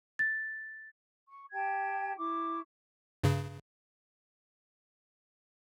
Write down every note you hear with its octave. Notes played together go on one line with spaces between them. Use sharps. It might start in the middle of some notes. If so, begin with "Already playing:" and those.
A6
C#6
G4 G5 A5 G#6
E4 C#6 D6
G2 C#3